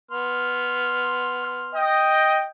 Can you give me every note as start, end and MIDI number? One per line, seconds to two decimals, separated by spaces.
0.11 1.84 59
0.11 1.84 84
0.11 1.84 89
1.74 2.45 75
1.74 2.45 79